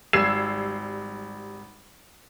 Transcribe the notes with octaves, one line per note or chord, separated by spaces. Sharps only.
G#1 G3 E6 G#6 C7 E7